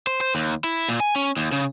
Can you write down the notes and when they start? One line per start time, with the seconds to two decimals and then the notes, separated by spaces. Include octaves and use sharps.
0.07 C5
0.21 C5
0.35 D#2
0.64 E4
0.89 A#2
1.00 G#5
1.16 C#4
1.37 D#2
1.52 C#3